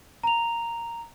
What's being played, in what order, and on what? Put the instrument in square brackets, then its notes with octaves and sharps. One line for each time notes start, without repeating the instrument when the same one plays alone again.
[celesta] A#5 F7